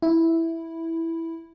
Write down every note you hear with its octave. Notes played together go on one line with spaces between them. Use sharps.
E4